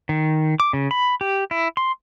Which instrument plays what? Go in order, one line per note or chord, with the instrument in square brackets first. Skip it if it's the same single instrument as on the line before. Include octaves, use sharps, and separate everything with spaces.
[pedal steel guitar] D#3
D6
C#3
B5
G4
E4
C6